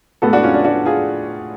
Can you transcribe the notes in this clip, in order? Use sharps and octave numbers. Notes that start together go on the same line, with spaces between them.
A2 G#3 B3 F#4 A4
D4 F#4
C#4 F4
D4
D4 F#4
F4 G#4